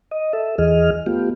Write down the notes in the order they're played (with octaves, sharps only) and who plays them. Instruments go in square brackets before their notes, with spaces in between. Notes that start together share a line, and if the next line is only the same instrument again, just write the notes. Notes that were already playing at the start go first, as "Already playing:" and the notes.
[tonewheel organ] D#5
A4 E5
E2 E3 G#4 D#5 F6
A3 B3 F4 G4